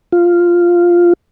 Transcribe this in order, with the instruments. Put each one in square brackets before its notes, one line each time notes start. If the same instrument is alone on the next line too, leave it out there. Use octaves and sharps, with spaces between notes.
[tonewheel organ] F4